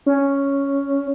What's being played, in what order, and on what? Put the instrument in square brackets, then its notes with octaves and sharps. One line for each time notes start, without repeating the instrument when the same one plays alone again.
[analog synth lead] C#4